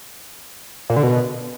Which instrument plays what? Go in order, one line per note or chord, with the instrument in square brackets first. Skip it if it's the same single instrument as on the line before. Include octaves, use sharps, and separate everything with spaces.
[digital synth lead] A#2
D3
B2